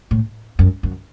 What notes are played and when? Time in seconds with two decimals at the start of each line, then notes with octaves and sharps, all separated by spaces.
0.11 A2
0.59 F#2
0.83 F#2